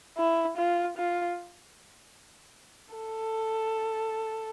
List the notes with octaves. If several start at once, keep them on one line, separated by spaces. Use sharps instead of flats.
E4
F4
F4
A4